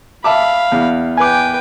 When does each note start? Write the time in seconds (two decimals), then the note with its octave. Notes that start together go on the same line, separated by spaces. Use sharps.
0.24 E5 F5 A5 B5 D6
0.72 E2
1.18 B4 G5 G#5 D6